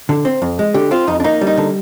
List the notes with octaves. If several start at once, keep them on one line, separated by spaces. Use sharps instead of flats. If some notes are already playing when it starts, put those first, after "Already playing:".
D3
C4
F2
G#3
D3 G4
C4 F4
F2 D#4
D4
A#3 D#4
G3
D#4
D3